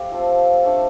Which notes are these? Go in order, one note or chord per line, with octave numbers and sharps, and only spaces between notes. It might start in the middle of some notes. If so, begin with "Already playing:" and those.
Already playing: A3 G4 C5 F5
F3 C4 A4
A3 D4 A4